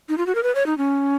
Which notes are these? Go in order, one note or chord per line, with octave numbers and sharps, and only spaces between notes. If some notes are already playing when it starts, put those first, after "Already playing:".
D#4
F4
F#4
A#4
B4
C#5
D#4
C#4